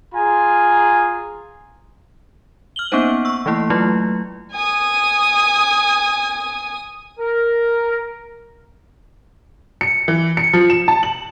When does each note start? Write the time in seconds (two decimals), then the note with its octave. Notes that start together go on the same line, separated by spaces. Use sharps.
0.14 F4 G#4 G#5 A#5
2.76 F6 F#7 G7
2.92 A#3 B3 C#4 D#4 C5
3.25 C#6 E6
3.46 E3 A3 A#3 E4
3.70 F#3 A3 E4 F4
4.52 G#5 D#6
7.20 A#4
9.81 C#7
10.08 E3
10.37 C#7
10.53 F3
10.70 E7
10.88 A5
11.03 F#7